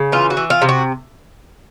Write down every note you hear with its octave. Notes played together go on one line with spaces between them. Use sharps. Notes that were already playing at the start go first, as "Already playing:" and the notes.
Already playing: C#3
E3 F4
F#4
E3
F4
C3
F#4